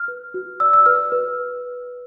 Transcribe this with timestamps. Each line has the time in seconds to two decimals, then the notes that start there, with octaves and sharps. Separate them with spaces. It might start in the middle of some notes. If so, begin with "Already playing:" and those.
Already playing: F6
0.08 B4
0.34 F#4
0.60 D5 E6
0.73 E6
0.86 B4 F6
1.12 B4